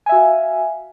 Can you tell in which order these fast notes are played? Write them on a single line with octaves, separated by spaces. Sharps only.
G#5 E5 F#4 F5